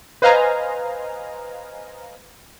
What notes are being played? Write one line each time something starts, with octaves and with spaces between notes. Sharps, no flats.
B4 C5 D#5 F5 G#5 A#5